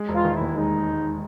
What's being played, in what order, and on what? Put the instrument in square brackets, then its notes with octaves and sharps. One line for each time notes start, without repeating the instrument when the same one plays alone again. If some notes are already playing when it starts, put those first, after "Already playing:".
Already playing: [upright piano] G#3
E1
[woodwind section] F4
[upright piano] D#3
[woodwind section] E4
[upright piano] D#2
[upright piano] G#3 [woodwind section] D#4